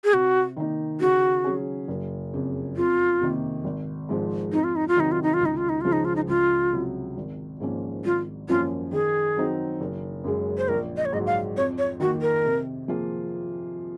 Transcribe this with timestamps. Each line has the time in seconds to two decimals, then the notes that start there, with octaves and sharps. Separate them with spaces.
0.04 G#4
0.13 C3 F#4
0.57 D#3 A#3 D#4
1.00 C#3 F#4
1.44 F#3 C#4 G#4
1.88 F#1
2.33 F2 C#3
2.76 F2 F4
3.21 C3 D#3 A#3
3.64 G#1
4.09 G#2 F3 G#3
4.53 F2 D#4
4.64 F4
4.76 D#4
4.88 F4
4.96 C3 D#3 F#3 D#4
5.12 F4
5.23 D#4
5.34 F4
5.41 C#2 D#4
5.57 F4
5.69 D#4
5.81 C#3 F3 G#3 F4
5.92 D#4
6.05 F4
6.16 D#4
6.28 C#2 F4
6.72 C3 F#3
7.17 G#1
7.60 G#2 F3 A#3 C#4
8.04 G#1 F4
8.48 F#2 F3 A#3 C#4 F4
8.92 D#3 G#4
9.37 F#3 C4 D#4
9.81 F#1
10.24 F#2 C#3 G#3
10.58 C5
10.68 A#1 A#4
10.97 D#5
11.06 C#5
11.12 G#2 F#3 D#5
11.26 F5
11.56 F2 C#5
11.78 C#5
12.00 D#3 F#4
12.04 A#3
12.22 A#4
12.45 C3
12.88 F3 A#3 F4 G#4